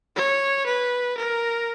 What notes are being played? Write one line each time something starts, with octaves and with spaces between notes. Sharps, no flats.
C#5
B4
A#4